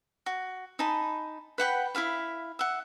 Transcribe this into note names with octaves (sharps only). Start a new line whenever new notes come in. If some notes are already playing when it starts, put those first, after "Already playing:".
F#4
D#4 G#5 A5 B5
B4 F#5 G5 B5
E4 G#4 F5 B5
E5 F#5